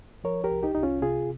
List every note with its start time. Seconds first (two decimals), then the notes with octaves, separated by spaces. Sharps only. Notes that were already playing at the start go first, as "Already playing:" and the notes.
0.24 F3 A#4 C#5
0.44 G4 A#4
0.51 C2
0.63 D#4 G4
0.75 C2 D#4
0.83 C#4 F4
1.02 C3 F4 G#4